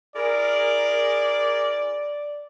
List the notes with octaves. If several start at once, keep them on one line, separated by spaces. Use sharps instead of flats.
E4 G#4 A#4 D5